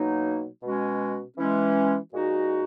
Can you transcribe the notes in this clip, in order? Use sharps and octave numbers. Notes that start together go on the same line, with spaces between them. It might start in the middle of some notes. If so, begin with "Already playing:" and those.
Already playing: B2 F#3 A#3 D#4
B2 G#3 C#4 F#4
E3 G#3 C#4
A#2 G#3 D#4 F#4